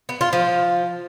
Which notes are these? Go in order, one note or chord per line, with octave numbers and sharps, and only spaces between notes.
B3
F4
F3